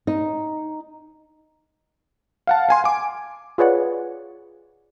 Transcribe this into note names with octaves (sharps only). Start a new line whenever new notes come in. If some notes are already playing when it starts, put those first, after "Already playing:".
D#4
F5 F#5 A5
F5 G#5 C6
G#5 D6
F4 G#4 B4 C#5 D5 F#5